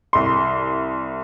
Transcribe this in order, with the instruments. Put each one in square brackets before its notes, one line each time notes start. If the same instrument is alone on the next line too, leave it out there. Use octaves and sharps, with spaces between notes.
[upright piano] C2 C6